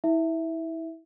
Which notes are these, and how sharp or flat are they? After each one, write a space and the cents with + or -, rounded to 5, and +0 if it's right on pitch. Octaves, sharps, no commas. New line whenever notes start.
E4 -25 E5 +0